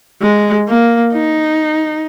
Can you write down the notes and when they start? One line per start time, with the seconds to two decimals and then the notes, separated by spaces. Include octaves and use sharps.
0.22 G#3
0.68 A#3
1.14 D#4